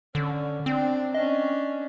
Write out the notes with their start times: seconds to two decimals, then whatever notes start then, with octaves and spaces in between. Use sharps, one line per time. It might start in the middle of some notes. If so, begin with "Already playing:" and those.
0.15 D3 C#4
0.66 C4 D4
1.14 C#4 D4 D#5